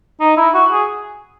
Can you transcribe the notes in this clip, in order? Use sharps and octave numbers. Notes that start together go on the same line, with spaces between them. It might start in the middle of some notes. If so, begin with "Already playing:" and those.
D#4
E4
F#4
G#4